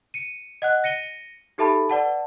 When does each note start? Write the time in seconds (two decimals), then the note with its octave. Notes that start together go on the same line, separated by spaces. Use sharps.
0.14 C#7 D#7
0.62 D#5 F#5 F#6
0.84 A#6 C#7 D#7 G7
1.58 D#4 G4 A4 E5 A5 B5
1.90 B4 D5 F#5 A5